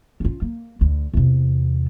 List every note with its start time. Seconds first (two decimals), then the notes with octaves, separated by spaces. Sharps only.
0.20 C#4 F4
0.42 A#3
0.81 D2
1.14 E2 C3